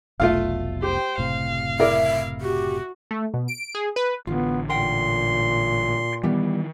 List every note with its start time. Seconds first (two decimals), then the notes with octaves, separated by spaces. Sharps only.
0.20 F1 B1 B2 A3 F4 F5
0.82 G4 C5 G5
1.18 F#1 A2 C3 F5
1.79 E4 A#4 D5 E5
2.41 F#4 G4
3.11 A3
3.34 B2
3.48 D7
3.75 G#4
3.96 B4
4.27 A1 D3 B3 F4
4.69 A#2 A#4 F#5 G5 C6
6.24 D#3 E3 G3 B3 G4